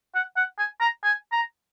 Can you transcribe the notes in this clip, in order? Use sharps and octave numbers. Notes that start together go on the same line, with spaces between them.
F#5
F#5
G#5
A#5
G#5
A#5